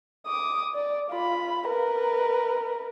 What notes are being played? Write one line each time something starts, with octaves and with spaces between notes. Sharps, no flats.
D6 D#6
D5
F4 B5
A#4 B4